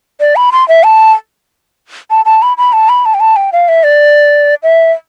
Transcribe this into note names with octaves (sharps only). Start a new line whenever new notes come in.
D5
B5
C6
E5
A5
A5
A5
B5
B5
A5
B5
A5
G5
A5
G5
F5
E5
D5
E5